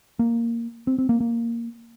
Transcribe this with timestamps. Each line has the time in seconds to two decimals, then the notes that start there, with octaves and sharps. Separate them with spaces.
0.19 A#3
0.87 C4
0.98 C4
1.09 A#3
1.20 A#3